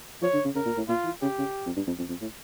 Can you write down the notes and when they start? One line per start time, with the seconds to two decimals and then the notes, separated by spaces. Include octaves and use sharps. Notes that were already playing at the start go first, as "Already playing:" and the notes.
0.22 F3 C#5
0.33 D3
0.45 C#3
0.55 C#3 A#4
0.66 A#2
0.77 A2
0.88 A#2 F4
1.04 E3
1.22 C#3 G4
1.39 C#3
1.66 F2
1.76 G2
1.87 F2
1.98 F2
2.09 F2
2.21 A2